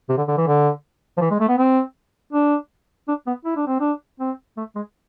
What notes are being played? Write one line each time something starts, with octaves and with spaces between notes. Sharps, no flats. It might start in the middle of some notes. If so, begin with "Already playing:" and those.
C3
D3
D3
E3
D3
F3
E3
G#3
A3
B3
C4
D4
D4
B3
E4
D4
C4
D4
C4
A3
G#3